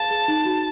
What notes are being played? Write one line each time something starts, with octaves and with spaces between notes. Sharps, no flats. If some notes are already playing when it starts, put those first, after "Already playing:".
Already playing: G#4 F5 A5
G#4
D#4
F#4